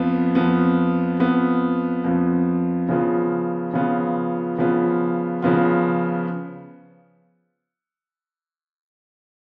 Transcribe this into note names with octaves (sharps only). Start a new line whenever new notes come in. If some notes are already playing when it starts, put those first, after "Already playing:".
Already playing: F2 F3 B3
F2 F3 B3
F2 F3 B3
F2 F3 B3
C#3 F3 B3 F4
C#3 F3 B3 F4
C#3 F3 B3 F4
C#3 F3 B3 F4